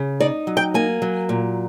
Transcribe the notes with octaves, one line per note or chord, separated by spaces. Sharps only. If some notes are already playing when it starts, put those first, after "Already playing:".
Already playing: C#3
D#4 D5
F#3
G5
A#3 G#5
F#3
A#2